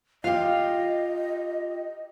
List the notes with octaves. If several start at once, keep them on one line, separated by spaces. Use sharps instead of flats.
F4 G4 D#5 F5